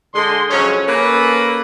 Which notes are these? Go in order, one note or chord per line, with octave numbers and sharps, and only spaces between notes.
D3 G#3 C6
C#3 F3 F#3 C#4
A#3 C#4 A4 B4